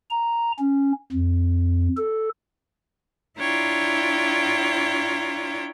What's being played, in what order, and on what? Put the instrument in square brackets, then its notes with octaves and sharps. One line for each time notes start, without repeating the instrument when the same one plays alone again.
[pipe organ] A#5
C#4
F2
A4
[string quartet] D4 E4 F4 C#5 G5 A#5